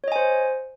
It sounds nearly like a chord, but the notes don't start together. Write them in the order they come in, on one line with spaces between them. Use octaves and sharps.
C#5 D#5 G#5 C5